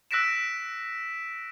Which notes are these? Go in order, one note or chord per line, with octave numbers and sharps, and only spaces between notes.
E6 F#6 A#6 B6 D7 E7